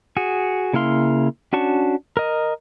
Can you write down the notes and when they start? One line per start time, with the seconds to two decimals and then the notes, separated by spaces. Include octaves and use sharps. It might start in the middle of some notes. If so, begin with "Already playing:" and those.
0.17 F#4 G#4
0.74 C#3 A#3 E4 F5 C6
1.53 C#4 D4 F#4 A5 C#6
2.17 A#4 D#5